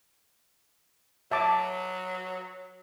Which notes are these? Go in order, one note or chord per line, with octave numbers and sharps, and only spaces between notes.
F#3 E5 A5 D6